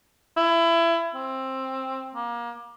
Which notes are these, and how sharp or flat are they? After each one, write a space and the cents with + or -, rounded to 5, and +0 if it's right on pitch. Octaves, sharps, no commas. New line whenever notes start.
E4 +25
C4 +15
A#3 +25